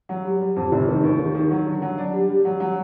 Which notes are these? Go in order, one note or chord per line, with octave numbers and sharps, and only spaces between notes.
F#3
G3
G3
F2
F1
D#3
D#2
D#3
D#3
F#3
D3
F#3
D4
G3
G3
F#3
F#3